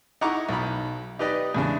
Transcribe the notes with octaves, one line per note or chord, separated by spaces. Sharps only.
D#4 E4 F#5 A#5 C#6 D6
B1 B5
D#4 G4 B4 D5 D#5
E2 C#3 G#3 D4